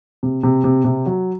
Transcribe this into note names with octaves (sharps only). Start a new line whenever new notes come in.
C3
C3
C3
C3
F#3